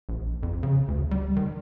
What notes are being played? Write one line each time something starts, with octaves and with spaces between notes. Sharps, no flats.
A#1
F2
C#3
D2
G3
D#3